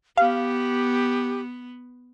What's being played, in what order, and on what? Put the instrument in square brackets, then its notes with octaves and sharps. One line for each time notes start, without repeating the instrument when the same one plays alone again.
[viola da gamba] B3 [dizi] G4 [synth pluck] F5